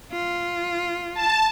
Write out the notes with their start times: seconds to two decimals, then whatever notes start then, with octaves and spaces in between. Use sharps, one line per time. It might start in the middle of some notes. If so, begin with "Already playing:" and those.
0.12 F4
1.14 A5